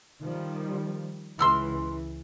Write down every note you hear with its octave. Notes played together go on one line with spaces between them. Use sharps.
D#3 F3 G3
C#2 E3 C6 E6 F6